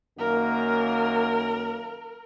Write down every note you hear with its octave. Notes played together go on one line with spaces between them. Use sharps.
F#2 D#3 A#3 A#4